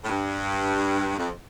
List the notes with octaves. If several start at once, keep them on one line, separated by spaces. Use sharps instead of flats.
A2
G2
F2